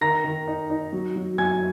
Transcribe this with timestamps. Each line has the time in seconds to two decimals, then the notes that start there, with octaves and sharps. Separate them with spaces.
0.01 D#3 A#5 A#6
0.24 D#3
0.47 D#4
0.70 D#4
0.93 F#3
1.16 F#3
1.38 F#3 G#5 G#6